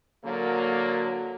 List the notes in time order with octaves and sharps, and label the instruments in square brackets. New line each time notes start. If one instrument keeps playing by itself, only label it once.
[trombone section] D3 F#3 A#3